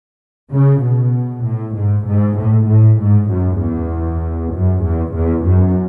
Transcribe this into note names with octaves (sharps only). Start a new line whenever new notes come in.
C#3
B2
A2
G#2
G#2
A2
A2
G#2
F#2
E2
F#2
E2
E2
F#2